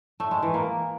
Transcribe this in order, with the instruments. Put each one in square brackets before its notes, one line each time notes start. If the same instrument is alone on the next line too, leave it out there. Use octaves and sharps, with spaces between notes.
[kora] A3
G#3
E3
A#3